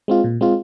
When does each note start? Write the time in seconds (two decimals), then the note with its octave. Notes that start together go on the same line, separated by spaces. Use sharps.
0.08 G#3 C4 F4
0.24 A#2
0.41 G#3 C4 F4